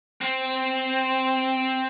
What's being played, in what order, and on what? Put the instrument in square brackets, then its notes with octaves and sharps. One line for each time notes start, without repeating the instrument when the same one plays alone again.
[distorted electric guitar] C4